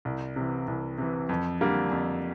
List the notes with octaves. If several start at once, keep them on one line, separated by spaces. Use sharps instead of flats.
C2
C3 E3
C2
C3 E3
F2
D3 G3 A#3
F2